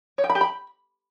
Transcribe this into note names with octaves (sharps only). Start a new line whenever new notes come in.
C#5
G5
B5
G4
B5